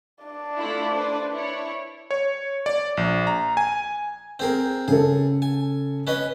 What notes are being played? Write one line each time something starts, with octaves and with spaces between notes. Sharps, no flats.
D4 D5
A3 E4 F4
B4 C5
E4 C#5
C#5
D5
A#1
A#5
G#5
C4 G#4 A#4
C#3 G#4 A4
G#5
C#4 B4 D#5